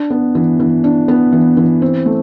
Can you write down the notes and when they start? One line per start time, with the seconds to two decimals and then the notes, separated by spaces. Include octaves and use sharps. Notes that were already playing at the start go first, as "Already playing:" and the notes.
Already playing: D4
0.10 B3
0.35 E3
0.60 E3
0.84 D4
1.08 B3
1.32 E3
1.57 E3
1.82 C4
2.06 A3